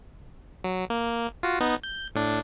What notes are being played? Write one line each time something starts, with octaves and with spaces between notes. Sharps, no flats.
F#3
A#3
F4 F#4
B3 D#4
G6
A2 D4